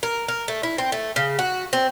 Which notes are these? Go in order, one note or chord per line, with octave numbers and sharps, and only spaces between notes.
A#4
A#4
A3
E4
C4
A3
C#3
F#4
C4